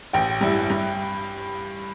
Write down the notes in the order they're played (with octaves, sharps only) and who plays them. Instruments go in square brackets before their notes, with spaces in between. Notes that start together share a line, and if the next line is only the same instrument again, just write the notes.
[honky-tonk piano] A1 [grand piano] G5
[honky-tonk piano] G2 G3 E4
G2